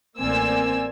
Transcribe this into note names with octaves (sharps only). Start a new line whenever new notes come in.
A1 A#3 C4 D5 G#5 E6